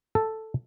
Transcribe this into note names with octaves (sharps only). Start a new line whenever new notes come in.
A4